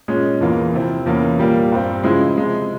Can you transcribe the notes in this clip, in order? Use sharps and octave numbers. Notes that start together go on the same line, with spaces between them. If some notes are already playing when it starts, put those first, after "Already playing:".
A#2 G#3 C#4
E2 E3 A#3 F4
C3 F3 C4 E4
E2 E3 A#3 C#4
A#2 G3 A#3
G2 G3 C4
C#3 F3 G#3 E4
C3 F3 G#3